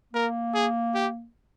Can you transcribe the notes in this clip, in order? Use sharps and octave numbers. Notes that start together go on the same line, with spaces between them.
A#3 A#4
G#4
G4